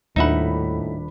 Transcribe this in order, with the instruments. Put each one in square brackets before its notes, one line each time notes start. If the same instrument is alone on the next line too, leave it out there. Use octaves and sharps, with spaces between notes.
[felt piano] D#1 D4 B5 [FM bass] D#2 [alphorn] A2 [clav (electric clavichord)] D#4 E5 F#5